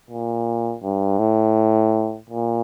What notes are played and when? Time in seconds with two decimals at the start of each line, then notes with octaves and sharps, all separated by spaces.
0.10 A#2
0.83 G2
1.19 A2
2.30 A#2